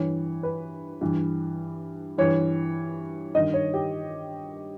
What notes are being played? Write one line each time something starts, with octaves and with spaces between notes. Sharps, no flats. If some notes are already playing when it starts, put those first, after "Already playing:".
Already playing: G2 E3 C#5
B4
G2 E3
G2 E3 C#5
G2 D#3 D#5
C#5
G4